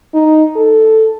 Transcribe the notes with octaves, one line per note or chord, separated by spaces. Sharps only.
D#4
A4